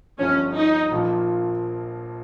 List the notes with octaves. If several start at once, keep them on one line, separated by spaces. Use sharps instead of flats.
G1 G2 F3 C#4
D#4
A#1 A#2 F3 A#3